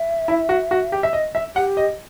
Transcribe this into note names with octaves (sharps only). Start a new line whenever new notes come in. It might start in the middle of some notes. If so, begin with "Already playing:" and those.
Already playing: E5
E4
F#4
F#4
G4
E5
D#5
E5
G4 F#5
D#5